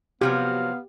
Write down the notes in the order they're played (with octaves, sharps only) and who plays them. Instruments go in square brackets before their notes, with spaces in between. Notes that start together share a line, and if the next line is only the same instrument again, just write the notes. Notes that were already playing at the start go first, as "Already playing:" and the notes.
[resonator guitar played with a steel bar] C3 F3 F#3 [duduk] B3 [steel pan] G4 [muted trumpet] F5